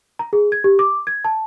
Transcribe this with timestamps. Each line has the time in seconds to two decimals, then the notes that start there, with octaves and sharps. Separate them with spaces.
0.19 A#5
0.33 G#4
0.52 G#6
0.64 G4
0.79 D6
1.07 G#6
1.25 A5